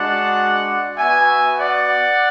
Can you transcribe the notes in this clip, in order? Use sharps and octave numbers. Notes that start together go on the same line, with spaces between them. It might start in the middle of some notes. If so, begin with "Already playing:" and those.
Already playing: G#3 D4 F#4 D5 F#5
B3 F#4 E5 G#5
D5 F#5